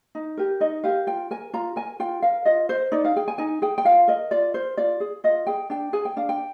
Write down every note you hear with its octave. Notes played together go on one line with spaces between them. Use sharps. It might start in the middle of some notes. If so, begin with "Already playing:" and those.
D#4
G4 A#4
D#4 D#5
G4 A#4 F5
F4 G5
A#4 G#5
F4 A#5
A#4 G#5
F4 G5
A#4 F5
F4 D#5
A#4 C5
D#4 D5
F5
G#4 G5
G#5
D#4 G#5
G#4 G5
G5
F4 F5
A#4 D#5
F4 D5
A#4 C5
F4 D5
G#4
F4 D#5
G#4 G5
D4 G5
G#4 G#5
G5
D4 F5
G5